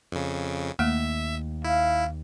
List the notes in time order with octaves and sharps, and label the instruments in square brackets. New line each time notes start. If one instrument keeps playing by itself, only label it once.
[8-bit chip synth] F2 C#3
[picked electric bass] D#2 [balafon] A3 A#3 [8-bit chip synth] E5
[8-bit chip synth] E4 [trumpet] F5